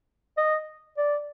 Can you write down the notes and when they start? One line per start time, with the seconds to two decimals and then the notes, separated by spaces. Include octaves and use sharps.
0.37 D#5
0.98 D5